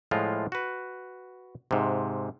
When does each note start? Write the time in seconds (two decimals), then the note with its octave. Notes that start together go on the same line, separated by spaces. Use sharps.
0.11 A2 F3 G#3 F4
0.52 F#4 B4
1.71 G#2 C3